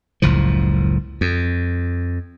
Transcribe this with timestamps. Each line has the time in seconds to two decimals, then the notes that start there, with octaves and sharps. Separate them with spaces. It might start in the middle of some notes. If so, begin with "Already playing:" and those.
0.22 F#1 C#2 A2 F3
1.21 F2